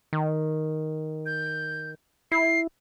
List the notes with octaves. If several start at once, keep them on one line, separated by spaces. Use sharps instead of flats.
D#3
G6
E4 C7